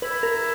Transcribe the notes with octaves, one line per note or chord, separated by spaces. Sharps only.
E4 B4
A#4
E4